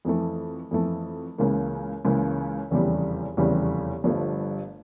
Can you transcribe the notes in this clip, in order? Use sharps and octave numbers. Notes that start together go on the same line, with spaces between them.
F2 E3 A3
F2 E3 A3
C#2 C#3 E3 A#3
C#2 C#3 E3 A#3
F1 E2 C#3 E3 G3
F1 E2 C#3 E3 G3
G1 G2 F3 A3